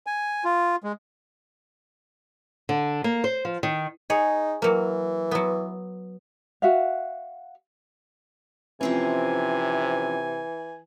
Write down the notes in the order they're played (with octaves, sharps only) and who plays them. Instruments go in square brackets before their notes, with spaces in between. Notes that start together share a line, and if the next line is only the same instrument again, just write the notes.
[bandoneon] G#5
F4
G#3
[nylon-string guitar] D3
A#3
C5
F3
D#3
[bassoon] D#4 [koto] G#4 C#5
[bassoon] E3 [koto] F#3 A#3
[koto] F#3 B3
[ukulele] F#4 E5 F5
[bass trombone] C3 [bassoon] E3 [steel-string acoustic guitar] F3 C4 C#4 [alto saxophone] G#5